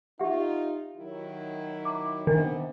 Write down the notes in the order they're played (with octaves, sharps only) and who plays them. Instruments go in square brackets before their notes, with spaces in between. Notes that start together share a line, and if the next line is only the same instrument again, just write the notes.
[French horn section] D#4 F4 [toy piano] G4 E5 F#5
[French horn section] D#3 F#3 E4
[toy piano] A#5 D6
[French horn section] C3 B3 [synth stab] D#3 [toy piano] D4 D#5